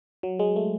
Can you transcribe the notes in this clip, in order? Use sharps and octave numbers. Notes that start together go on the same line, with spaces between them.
F#3
G#3
A3